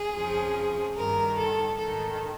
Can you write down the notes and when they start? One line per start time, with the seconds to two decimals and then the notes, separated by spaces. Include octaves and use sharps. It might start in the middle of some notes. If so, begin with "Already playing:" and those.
Already playing: G#4
0.14 F2 C#3 F3
0.97 G2 D#3 A#4
1.37 A4
1.79 G#2 D#3 A4